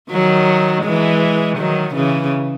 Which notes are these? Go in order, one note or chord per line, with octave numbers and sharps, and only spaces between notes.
D#3 F#3
E3 G#3
D#3 F#3
C#3 E3